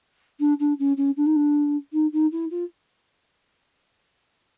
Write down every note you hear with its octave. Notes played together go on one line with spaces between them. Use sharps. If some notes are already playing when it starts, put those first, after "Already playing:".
D4
D4
C#4
C#4
D4
D#4
D4
D#4
D#4
E4
F4